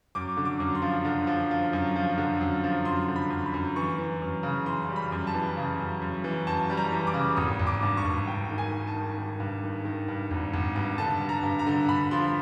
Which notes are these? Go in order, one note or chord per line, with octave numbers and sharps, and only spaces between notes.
F#2 D6
D3
D6
F#2
C6
F3
D3
F3
F3
F#2
F3
D3
F#2
F3
F#2 C6
D3
B5
F#2
B5
F#2
E3 C#6
E3
F#2
C#3
E3 C6
G3
B5
F#2
A5
E3
C#3
F#2
F#2
E3
F#2 A5
G3
A#5
E3
D6
C#3
G#1 D#6
G#1
D6
G2
C#6
G#1
G2 G5
D#3
G#5
D#3
A5
D#3
D#3
G2
D#3
D#3
G2
G#1
G#1
G2
D3 A5
G2
A#5
G2
A#5
D3
G2 B5
F3 C6